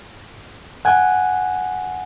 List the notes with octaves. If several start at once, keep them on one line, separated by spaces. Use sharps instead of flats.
F#5 G#5